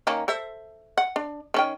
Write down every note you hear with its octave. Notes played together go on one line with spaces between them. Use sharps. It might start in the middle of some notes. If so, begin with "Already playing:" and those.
D#3 A#3 C#4
A4 C5 E5
F#5
D4
D#3 C#4 G5